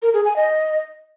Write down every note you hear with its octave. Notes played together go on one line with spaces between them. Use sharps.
A#4
G#4
G#5
D#5